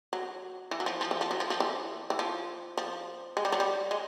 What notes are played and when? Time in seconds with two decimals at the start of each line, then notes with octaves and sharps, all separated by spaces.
0.13 F#3
0.71 E3
0.80 F#3
0.86 F3
1.01 F3
1.11 E3
1.21 F3
1.31 F#3
1.40 F3
1.50 F3
1.60 E3
2.10 E3
2.19 F3
2.77 F3
3.37 G#3
3.45 G3
3.52 F#3
3.60 G3
3.91 G#3